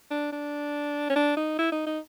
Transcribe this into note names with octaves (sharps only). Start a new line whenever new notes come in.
D4
D4
C#4
D4
D#4
E4
D#4
D#4